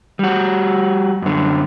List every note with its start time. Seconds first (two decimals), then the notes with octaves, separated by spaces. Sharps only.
0.19 G3 F#4
1.22 F#2 D3